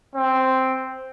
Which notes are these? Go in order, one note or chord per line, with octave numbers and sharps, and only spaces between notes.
C4